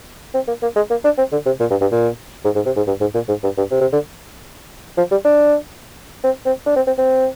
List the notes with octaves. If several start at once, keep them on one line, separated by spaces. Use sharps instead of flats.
C4
A#3
A#3
G#3
A#3
D4
C4
D3
C3
A#2
G2
G2
A#2
G#2
G#2
C3
G#2
G2
G#2
A#2
G#2
G2
G2
C3
C3
D3
F3
G3
D4
C4
C4
D4
C4
C4
C4